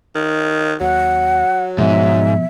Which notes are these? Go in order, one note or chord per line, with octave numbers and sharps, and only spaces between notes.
D#3
D#2 F#3 F#5
G#2 B2 F3 B3 E5